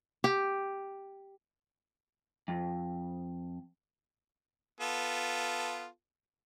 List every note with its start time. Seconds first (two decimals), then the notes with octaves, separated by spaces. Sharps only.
0.24 G4
2.48 F2
4.81 B3 F4 A4